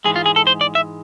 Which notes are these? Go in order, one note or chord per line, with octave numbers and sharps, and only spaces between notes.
G#2 E3 G#3 G#4
F4
G#4
A4
C5
D5
E5